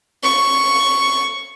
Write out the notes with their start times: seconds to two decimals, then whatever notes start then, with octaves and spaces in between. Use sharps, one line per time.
0.24 C#6